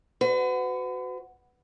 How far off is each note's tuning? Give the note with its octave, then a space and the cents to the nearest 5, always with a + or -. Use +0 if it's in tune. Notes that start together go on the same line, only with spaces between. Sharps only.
F#4 +0 B4 +40